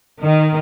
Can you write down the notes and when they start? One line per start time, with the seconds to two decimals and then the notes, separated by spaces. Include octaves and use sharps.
0.22 D#3